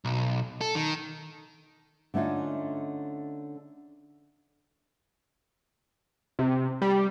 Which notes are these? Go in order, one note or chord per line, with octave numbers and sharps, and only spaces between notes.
B1
A4
D#3
D3 A3 C#4 D#4 F4
C3
G3